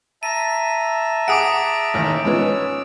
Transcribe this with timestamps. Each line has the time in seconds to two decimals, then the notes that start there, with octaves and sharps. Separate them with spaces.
0.23 E5 A5 A#5 D#7
1.28 G#4 F#5 D6 D#6 D7
1.94 A1 D#2
2.25 G#2 F3 B3 C#4 E6